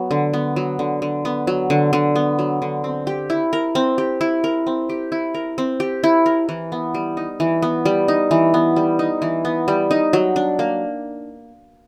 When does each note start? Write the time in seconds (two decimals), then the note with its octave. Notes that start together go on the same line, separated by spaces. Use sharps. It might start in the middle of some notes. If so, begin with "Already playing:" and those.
Already playing: F#3 B3
0.11 D3
0.34 B3
0.56 F#3
0.79 D3
1.02 D3
1.25 B3
1.47 F#3
1.70 D3
1.93 D3
2.16 B3
2.39 F#3
2.62 D3
2.84 C4
3.07 G4
3.30 E4
3.53 A#4
3.75 C4
3.98 G4
4.21 E4
4.44 A#4
4.67 C4
4.89 G4
5.12 E4
5.34 A#4
5.58 C4
5.80 G4
6.04 E4
6.26 A#4
6.49 E3
6.72 B3
6.95 G3
7.17 D#4
7.40 E3
7.62 B3
7.85 G3
8.08 D#4
8.31 E3
8.54 B3
8.76 G3
8.99 D#4
9.22 E3
9.45 B3
9.68 G3
9.91 D#4
10.13 F#3
10.36 D4
10.59 A#3